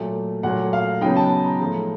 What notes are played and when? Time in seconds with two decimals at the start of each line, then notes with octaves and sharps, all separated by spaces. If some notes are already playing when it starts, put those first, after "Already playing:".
Already playing: A#2 F#3 A3
0.43 A#2 F#3 A3 F#5
0.73 F5
1.01 C#3 F#3 B3 D#4 G5
1.16 A5
1.45 A#5
1.59 A2 F3 G#3